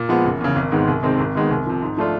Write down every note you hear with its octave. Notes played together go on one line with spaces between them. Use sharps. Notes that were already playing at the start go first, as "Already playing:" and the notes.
Already playing: A#2
F3 G#3 B3
F#1
E2 C#3
G#1
G#2 D#3 G#3 B3
C2
C3 D#3 G#3 C4
G#1
G#2 D#3 G#3 B3
C2
C3 F3
G#2
F3 A3 D4 F4